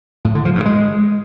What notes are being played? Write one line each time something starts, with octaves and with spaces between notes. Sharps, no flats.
A2
D3
F3
G2
G#3